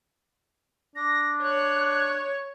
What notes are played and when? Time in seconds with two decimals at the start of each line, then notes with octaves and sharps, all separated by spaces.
0.96 D4 A#6
1.43 C#5 F#6